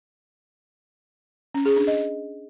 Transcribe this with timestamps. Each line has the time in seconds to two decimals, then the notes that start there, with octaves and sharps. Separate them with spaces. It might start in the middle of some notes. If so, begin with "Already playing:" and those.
1.55 C#4
1.65 G#4
1.76 D4
1.87 D#5